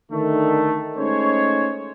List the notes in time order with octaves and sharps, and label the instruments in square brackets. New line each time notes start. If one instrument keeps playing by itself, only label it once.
[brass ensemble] D3 D#3 A3
G#3 A3 C#4 D#4 C5 C#5